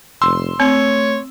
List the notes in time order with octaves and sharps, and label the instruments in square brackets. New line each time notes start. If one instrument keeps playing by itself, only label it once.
[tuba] F1 [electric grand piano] C6 E6
[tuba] A3 [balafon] C4 [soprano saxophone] C#5